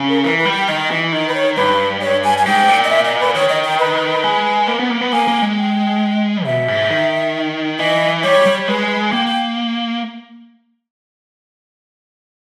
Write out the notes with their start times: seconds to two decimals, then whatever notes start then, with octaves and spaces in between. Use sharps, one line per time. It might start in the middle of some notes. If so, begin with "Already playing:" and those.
Already playing: C#3
0.09 A#4
0.23 E3 A#4
0.39 B4
0.45 G3
0.53 G5
0.68 D#3 D#5
0.91 E3
1.12 D#3 D#5
1.28 B4
1.34 C#5
1.57 G2 B4
2.01 C#5
2.24 G#5
2.38 G#5
2.46 G#2 G5
2.68 A#2
2.84 D#5
2.90 E5
3.05 D#5
3.20 B4
3.35 D#3 C#5
3.49 D#5
3.64 G5
3.79 B4
4.24 G#3
4.68 A#3
4.79 B3
4.90 A#3
5.01 B3
5.12 A#3 G#5
5.28 A#3
5.42 G#3
5.57 G5
6.46 B2 E5
6.68 G#2
6.90 D#3
7.79 E3 D#5
8.24 G3 C#5
8.46 G3
8.68 G#3 B4
9.12 A#3 G5
9.27 G5